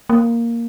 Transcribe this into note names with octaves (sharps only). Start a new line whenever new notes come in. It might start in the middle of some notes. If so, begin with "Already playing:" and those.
A#3